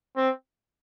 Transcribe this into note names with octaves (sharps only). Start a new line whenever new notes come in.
C4